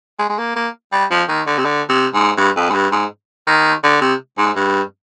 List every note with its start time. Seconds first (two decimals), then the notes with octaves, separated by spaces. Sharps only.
0.19 G#3
0.30 G#3
0.38 A#3
0.56 A#3
0.92 G3
1.11 F3
1.29 D#3
1.47 D3
1.58 C3
1.65 D3
1.90 C3
2.14 G#2
2.37 G2
2.57 F2
2.70 G#2
2.74 G2
2.92 G#2
3.47 D#3
3.84 D3
4.01 C3
4.38 G#2
4.56 G2